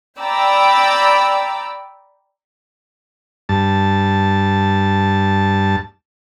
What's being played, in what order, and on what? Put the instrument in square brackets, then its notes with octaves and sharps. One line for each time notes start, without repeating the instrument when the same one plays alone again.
[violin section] D5 G5 A#5 B5 D6 E6
[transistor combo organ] G2 A5